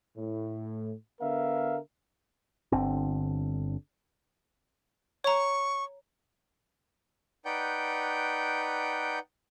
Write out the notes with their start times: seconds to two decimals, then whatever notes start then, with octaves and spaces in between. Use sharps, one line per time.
0.17 A2
1.21 D3 B3 A#4 E5 F5
2.72 G1 D3 C4
5.24 C#5 A#5 C#6
7.45 D#4 B4 D5 F#5 G5 G6